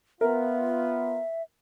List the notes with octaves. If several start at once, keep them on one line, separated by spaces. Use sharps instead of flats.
B3 F4 A#4 E5